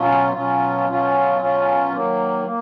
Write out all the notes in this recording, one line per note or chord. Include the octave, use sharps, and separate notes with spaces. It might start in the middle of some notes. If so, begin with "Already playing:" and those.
Already playing: B2 F#3 C#4 F4
B2 F#3 C#4 F4
B2 F#3 C#4 F4
B2 F#3 C#4 F4
D#3 F#3 A#3
A#3